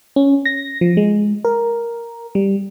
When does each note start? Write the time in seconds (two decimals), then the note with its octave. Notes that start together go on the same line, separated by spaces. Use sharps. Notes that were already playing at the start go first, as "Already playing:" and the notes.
0.16 C#4
0.45 A#6
0.81 F3
0.97 G#3
1.45 A#4
2.35 G3